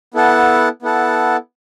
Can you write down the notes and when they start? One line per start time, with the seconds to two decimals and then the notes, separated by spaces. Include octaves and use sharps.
0.14 B3 E4 A4 F#5 A5
0.83 B3 E4 A4 F#5 A5